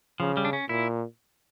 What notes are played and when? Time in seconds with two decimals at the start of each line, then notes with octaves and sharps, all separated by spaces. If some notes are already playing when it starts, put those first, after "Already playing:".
0.20 C#3 F3
0.37 G3
0.45 D4
0.53 C#4
0.69 A#2 E4